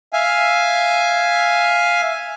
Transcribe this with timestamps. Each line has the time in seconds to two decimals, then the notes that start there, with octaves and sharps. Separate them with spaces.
0.13 E5 F5 G#5